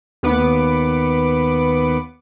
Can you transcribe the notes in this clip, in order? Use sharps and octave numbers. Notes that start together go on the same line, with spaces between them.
D#2 B3 B4 D6 C#7